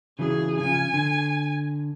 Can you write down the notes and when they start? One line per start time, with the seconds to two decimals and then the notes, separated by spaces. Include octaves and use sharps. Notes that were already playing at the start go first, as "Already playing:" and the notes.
0.19 C#3 E3 F#3 G#4
0.61 C#3 F3 G#5
0.94 D3